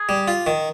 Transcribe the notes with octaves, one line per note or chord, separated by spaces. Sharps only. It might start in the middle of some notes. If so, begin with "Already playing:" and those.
Already playing: G#4
G3
F4
D#3